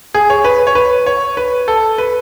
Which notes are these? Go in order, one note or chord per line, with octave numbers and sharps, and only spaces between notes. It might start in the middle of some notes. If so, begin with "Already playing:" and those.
G#4
C#5
B4
C#5
B4
C#5
B4
A4
B4